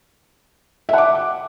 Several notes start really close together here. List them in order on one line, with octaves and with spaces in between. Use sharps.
E5 F#5 D6